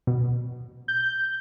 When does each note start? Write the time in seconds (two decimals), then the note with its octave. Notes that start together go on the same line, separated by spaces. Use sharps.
0.07 B2
0.88 G6